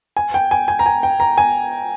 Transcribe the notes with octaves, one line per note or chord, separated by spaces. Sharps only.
G#5
G5
G#5
G#5
A#5
G#5
G5
A#5
G#5